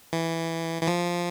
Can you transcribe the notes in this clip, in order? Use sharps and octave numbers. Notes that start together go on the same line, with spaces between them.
E3
E3
F3